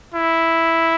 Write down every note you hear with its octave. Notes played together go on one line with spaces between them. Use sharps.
E4